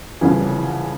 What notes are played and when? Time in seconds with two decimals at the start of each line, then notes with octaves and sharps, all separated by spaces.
0.21 C2 F2 C#3 E3